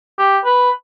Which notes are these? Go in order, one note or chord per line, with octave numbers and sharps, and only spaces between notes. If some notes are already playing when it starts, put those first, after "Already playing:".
G4
B4